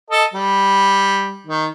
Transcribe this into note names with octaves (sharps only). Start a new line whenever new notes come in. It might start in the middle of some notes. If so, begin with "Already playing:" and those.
A4 D#5
G3
D#3